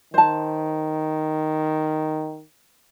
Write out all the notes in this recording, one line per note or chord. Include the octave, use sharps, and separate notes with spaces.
D#3 C5 A5